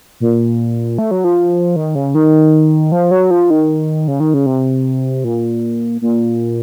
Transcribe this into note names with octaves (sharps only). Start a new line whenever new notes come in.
A#2
A3
F#3
F3
D#3
C#3
D#3
F3
F#3
F3
D#3
C#3
D#3
C#3
C3
A#2
A#2